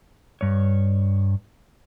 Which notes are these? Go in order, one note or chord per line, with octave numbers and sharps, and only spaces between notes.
G2 C#5